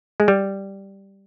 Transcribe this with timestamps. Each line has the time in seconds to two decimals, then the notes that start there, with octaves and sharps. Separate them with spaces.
0.20 G#3
0.28 G3